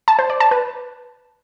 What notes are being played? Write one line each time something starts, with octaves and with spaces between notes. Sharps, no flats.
A5
C5
D5
A5
B4